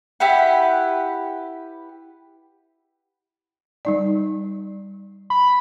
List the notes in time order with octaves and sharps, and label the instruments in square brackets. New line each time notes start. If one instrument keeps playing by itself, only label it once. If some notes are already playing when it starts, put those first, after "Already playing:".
[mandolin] E4 G4 B4 F#5
[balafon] G3 D#4 D5
[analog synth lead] B5